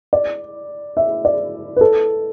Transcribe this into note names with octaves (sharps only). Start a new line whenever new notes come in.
D5
E5
D5
B4
A4